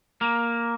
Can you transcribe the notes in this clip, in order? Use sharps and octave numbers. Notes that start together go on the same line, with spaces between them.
A#3